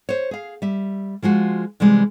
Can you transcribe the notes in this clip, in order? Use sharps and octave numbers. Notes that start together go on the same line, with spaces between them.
C5 C#5
G#4 F5
G3 E5
F3 G#3 F4 F#4
C3 E3 G3 G#3